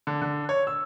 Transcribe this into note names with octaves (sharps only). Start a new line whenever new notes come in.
D3
D3
C#5
E6